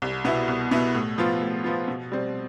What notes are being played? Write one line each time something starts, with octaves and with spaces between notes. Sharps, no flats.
C2
B2 B3 E4
C2
B2 B3 E4
A2
F3 B3 F4
A2
F3 B3 F4
B2
G3 C4